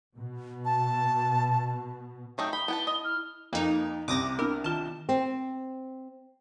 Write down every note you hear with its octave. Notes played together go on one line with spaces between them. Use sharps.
B2
A5
F#3 A3 D#4 G5
B5 G7
B3 E4 G5 A5
D#5
F6
F2 A#3 D#4
C2 C3 C4 D6 D#6 A#6
B3 D4 E4 A#4
D#3 F4 A5
C4